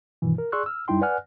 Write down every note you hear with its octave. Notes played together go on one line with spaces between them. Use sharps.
G2 B2 D#3 E3
A#4
G#4 D5 C6 C#6 E6 F#6
E6 F6
F#2 G3 D#4 E4 G5 C6
B4 D5 F#5 G#5 F6 F#6